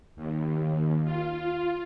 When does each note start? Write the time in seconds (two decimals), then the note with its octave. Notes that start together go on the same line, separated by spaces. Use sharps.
0.16 D#2
1.05 F4